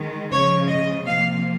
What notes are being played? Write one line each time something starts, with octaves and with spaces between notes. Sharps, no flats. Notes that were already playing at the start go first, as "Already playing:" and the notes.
Already playing: D#3 G#3
C#3 F3 G#3 C#5
D#5
C3 F3 A#3 F5